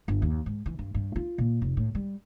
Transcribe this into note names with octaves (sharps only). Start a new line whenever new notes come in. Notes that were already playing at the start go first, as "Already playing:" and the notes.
G1
D#2
G#2
E3
G2
G2
F4
A#2
F1
A2
G3